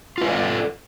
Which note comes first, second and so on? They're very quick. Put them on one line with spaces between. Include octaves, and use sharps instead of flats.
F4 B4 C#5 D5 A4